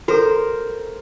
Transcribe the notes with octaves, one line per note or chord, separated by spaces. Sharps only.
F#4 A4 A#4 C5